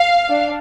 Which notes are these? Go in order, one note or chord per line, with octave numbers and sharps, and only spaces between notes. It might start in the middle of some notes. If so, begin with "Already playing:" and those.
Already playing: F5
D4